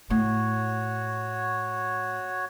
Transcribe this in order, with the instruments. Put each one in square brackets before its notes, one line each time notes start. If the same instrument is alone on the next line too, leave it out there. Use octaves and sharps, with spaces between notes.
[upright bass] A2 [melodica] F#4 C#5